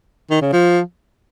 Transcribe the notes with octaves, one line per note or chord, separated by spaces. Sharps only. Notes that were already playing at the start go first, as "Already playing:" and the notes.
D#3
C#3
F3